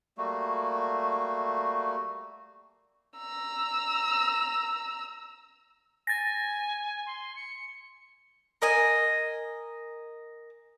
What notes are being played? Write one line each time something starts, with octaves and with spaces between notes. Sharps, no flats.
G3 A3 A#3 F#4
A#5 E6
G#5 A6 A#6
C6
C#7
A#4 D#5 G#5